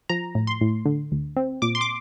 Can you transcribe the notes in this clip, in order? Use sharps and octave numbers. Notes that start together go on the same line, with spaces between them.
F3 A#5
A2
C6
A2
D3
D2
C4
A#2 D6
C6
D6